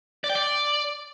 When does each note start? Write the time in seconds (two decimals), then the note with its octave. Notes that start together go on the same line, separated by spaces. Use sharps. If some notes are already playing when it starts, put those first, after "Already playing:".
0.24 D5
0.30 G5
0.35 D5